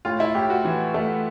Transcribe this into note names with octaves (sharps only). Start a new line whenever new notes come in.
A2 F4
E4
A2 G4
F#4
E3
A3